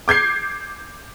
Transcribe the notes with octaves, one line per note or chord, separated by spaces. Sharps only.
D6 G6 G#6 C7